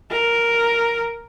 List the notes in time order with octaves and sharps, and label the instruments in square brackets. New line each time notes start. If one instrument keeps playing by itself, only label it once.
[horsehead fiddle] A#4